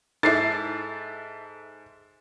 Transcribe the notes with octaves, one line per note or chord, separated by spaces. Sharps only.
G#2 D#4 E4 A4 E5 D6 A6 C7